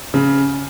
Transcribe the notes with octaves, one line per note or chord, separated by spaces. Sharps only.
C#3